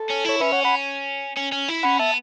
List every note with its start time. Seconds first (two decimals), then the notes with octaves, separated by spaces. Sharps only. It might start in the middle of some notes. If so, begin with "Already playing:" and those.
Already playing: A4
0.10 C#4
0.24 E4 C#5
0.40 C#4 B4 E5
0.52 C#5 F#5
0.64 F#5 B5
1.37 C#4
1.52 C#4
1.68 E4
1.83 C#4 F#5 B5
1.99 B3 E5 A5